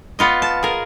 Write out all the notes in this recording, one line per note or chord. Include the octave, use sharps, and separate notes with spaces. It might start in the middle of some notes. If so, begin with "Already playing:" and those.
B3 F4 D#5
A5
G#4 A#4